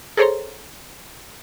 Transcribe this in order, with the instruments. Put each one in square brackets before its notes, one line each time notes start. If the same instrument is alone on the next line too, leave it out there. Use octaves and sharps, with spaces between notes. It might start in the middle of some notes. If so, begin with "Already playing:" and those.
[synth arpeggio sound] G#4 A4 C5 C#5 A#5 C6